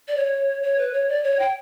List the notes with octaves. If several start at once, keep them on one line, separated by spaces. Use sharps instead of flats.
D5
C#5
C#5
B4
C#5
D5
C#5
G5